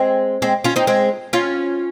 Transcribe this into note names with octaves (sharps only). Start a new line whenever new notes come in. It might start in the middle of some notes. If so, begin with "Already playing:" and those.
Already playing: G#3 C4
G#3 C4
C#4 F4
C4 D#4
G#3 C4
C#4 F4